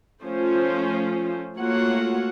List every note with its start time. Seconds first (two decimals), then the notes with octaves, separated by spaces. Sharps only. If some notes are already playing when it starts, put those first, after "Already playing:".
0.22 F3 A3 C#4 F4 C5
1.58 A3 A#3 F4 F#4 C#5 F#5